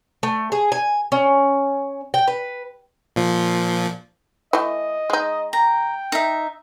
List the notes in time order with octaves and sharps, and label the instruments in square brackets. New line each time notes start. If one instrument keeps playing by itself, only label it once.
[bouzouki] A3
G#4
G#5
C#4
G5
B4
[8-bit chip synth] A#2 F3
[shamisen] E3 A3 [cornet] D#5
[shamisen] G#3 D#4
[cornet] G5 [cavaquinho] A#5
[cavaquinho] D#4 E5